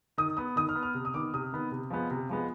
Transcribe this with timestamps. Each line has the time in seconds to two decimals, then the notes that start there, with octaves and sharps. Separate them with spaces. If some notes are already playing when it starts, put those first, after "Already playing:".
0.18 D#3 D#6
0.37 B3 D#6
0.56 D#3 D#6
0.69 F6
0.75 B3
0.83 F6
0.94 C3
1.05 D#6
1.14 D#3 B3 D6
1.34 C3 D#6
1.53 D#3 B3
1.72 C3
1.90 F3 G#3 B3
2.10 C3
2.29 F3 G#3 B3